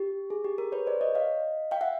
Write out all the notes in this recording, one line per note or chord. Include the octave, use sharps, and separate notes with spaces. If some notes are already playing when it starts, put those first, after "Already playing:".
Already playing: G4
G#4
G4
G#4 A#4
B4 C#5
C5 D5
C#5 D#5
D#5 F5
F5 G5
E5 F#5